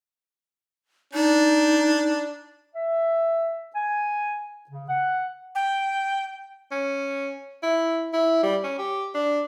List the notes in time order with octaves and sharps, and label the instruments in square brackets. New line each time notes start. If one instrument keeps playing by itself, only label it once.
[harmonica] D4 [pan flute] D#4
[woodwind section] E5
G#5
C#3
F#5
[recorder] G5
[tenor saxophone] C#4
E4
E4
G3
C#4
G4
D4